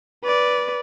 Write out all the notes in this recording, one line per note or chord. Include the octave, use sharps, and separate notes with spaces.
B4 D5